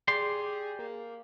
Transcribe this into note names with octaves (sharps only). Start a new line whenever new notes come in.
G4 G#4 D5 C6
A#3